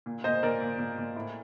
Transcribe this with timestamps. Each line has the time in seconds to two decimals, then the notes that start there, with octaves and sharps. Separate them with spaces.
0.06 A#2
0.24 A#2 C5 D#5
0.43 A#2 A#4 D5
0.61 A#2
0.79 A#2
0.98 A#2
1.16 A2